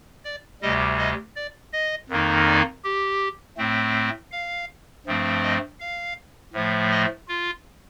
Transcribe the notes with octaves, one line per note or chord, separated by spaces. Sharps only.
D5
D2 C3 G3 D#5
D#5
D5
D#5
F2 D#3 A#3 D#4
D5
G4
A2 A3 C4
F5
G2 F3 A3 C4
D#5
F5
A2 F3 A3
D#5
F4